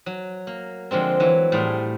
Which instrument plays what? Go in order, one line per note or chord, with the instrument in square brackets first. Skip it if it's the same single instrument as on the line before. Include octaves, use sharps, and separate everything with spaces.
[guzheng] F#3
A#3
D3 F3 G#3 C4
E3 F#3
A2 G3 F4 G#4